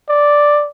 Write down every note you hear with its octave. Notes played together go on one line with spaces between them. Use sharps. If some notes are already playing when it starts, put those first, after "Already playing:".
D5